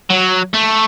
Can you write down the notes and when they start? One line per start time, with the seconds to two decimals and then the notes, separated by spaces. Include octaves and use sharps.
0.10 F#3
0.54 A3